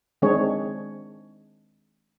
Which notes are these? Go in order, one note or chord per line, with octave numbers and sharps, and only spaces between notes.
D#3 G#3 C4 D4 G#4 C#5